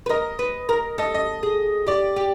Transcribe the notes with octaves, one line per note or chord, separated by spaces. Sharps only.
B4
A#4 D#5
B4
A#4
A4 D#5
D#5
G#4
G4 D5
G4